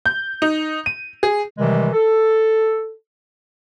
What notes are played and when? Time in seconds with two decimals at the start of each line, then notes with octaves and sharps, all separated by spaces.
0.06 G6
0.42 D#4
0.86 D#7
1.23 G#4
1.58 C3 D#3 E3 G3 G#3
1.93 A4